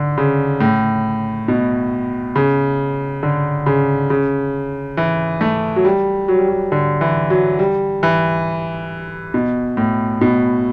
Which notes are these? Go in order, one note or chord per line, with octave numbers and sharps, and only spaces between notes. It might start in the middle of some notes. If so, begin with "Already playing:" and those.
Already playing: D3
C#3
A2
B2
C#3
D3
C#3
C#3
E3
A3
F#3
G3
F#3
G3
F#3
D3
E3
F#3
G3
E3
B2
A2
B2